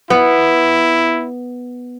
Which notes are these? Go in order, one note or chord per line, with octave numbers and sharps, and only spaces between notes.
B3 E4